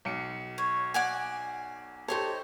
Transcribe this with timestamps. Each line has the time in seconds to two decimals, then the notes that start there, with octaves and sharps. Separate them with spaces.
0.05 B1 C#7
0.58 C#5
0.94 D5 F#5 G#5
2.08 D#4 G4 A4 C5 C#5